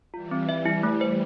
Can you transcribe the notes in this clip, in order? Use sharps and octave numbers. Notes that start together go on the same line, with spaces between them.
E3 G3 F4
C4
E5
E4
A3
C5